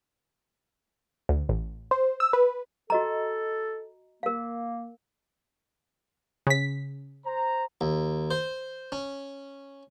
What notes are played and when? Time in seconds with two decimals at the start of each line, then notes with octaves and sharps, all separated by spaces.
1.29 D2
1.49 A1
1.91 C5
2.20 E6
2.33 B4
2.90 F#4 A4 D#5 A#5
4.23 A#3 A#4 F5
6.47 C#3 B6
7.25 C5 A#5
7.81 D#2
8.31 C5
8.92 C#4